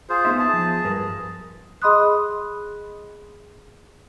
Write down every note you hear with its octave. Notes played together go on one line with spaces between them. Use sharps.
F4 G#4 C5
B3 D#4 E5
G#4 A5
F3
G2 A#4 B4
G#4 D#5 B5 C6 D#6 F#6